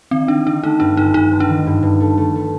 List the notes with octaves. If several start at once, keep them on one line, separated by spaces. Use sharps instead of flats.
D#3 C4
D#3 D4
D#3 D4
A3 D#4
G2 D4
G1 D#4
G2 D#4
G1
D4
D#3
G2
G2
A3
A3
A3